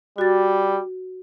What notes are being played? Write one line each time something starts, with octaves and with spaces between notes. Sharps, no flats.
G3 F#4 A6